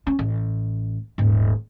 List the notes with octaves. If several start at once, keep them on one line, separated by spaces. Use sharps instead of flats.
C#4
A1
D#1 G#2